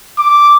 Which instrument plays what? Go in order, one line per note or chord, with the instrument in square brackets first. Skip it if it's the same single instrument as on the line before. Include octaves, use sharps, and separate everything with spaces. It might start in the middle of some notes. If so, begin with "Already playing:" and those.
[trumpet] D6